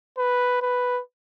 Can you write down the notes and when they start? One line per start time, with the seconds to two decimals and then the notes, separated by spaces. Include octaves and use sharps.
0.18 B4
0.62 B4